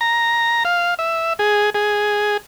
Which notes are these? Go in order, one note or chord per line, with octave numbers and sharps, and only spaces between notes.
A#5
F5
E5
G#4
G#4